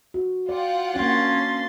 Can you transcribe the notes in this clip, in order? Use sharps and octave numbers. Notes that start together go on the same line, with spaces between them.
F#4
F4 D5 F#5 G5
A#3 C#4 D4 C6 A6